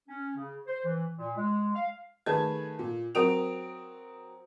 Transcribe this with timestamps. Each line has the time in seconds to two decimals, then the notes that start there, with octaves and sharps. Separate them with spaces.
0.08 C#4
0.36 C#3
0.67 C5
0.85 E3
1.19 A#2
1.37 G#3
1.75 F5
2.26 D#3 A3 G#4 B4 A5 G#6
2.79 A#2
3.15 F#3 C4 A#4 D#6 D7 F7